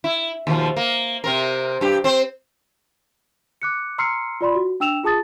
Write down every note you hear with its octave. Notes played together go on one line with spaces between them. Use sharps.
E4
D#2 B2 F3
A#3
C3 C4 A#4
G2 G4
C4 C5
D6 F#6 C#7
A#5 C6 E6 F6 C7 C#7
F4 D5 B5 C6
F#4
D4 G5 E6 E7 F7
F4 G#4 A5 D#6 A6